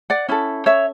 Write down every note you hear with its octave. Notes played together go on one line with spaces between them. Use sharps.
D5 F#5
C#4 E4 A4
C#5 E5